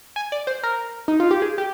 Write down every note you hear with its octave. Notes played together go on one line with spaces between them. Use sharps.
G#5
D5
C5
A#4
D#4
F4
G4
G#4
G4